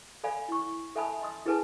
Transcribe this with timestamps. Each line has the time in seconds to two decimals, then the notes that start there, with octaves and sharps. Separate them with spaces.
0.24 A4 D5 F5 G#5 B5
0.49 E4 C#6
0.95 A4 E5 G#5 A5 B5 D#6
1.21 D#5 C6 D#6
1.46 E4 G#4 A4 B4 G#5 A5